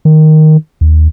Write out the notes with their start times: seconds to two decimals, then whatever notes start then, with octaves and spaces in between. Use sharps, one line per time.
0.05 D#3
0.81 D#2